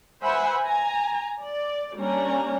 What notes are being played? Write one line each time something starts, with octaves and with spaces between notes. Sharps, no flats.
B4 C5 E5 F#5 G#5 B5
G#5 A#5
D5
G3 A#3 C#4 D4 A#5